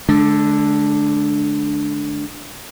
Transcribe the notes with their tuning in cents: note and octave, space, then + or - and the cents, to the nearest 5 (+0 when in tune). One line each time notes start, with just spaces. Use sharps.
D3 +0 G#3 +45 D4 +0